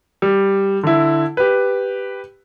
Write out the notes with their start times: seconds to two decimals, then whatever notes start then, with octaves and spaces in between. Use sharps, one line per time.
0.22 G3
0.83 D3 E4
1.37 G4 B4